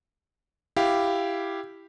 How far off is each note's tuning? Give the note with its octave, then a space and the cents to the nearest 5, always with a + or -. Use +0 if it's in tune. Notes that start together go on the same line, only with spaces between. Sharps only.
E4 +10 G4 +0 F5 +0